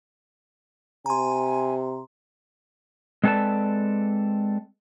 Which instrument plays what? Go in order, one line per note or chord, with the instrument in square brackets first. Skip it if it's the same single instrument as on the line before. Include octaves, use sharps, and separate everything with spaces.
[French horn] C3 [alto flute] G#5 [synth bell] A#5 C6
[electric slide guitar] G#3 C4 A4 B4 D5 A5